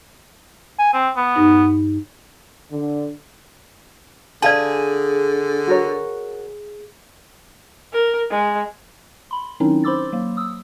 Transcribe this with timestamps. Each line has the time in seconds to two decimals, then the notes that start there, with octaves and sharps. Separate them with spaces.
0.79 G#5
0.94 C4
1.17 B3
1.36 G2 D#4
2.71 D3
4.42 D3 G#4 D5 F5 A5
5.67 F#4 A#4 C#5
7.93 A#4
8.31 G#3
9.31 B5 C6
9.60 D#3 F#3 C4 C#4 D#4 E4
9.84 C5 B5 C6 D6 E6 A6
10.13 F#3 A#3
10.37 D#6 E6